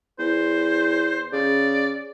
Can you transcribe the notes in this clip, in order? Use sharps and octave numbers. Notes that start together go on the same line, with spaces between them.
E2 C5
C#3 D5